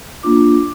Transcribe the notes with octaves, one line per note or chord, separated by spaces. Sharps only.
A#3 D4 F4 D6